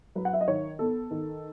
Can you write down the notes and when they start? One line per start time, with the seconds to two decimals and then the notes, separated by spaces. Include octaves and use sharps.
0.15 F#3 B4
0.25 F#5
0.33 E5
0.41 D#5
0.47 D#3 C#5
0.79 B3 A4
1.11 D#3